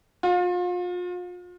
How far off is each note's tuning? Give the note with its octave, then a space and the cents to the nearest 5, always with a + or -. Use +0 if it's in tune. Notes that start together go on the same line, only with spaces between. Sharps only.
F4 +35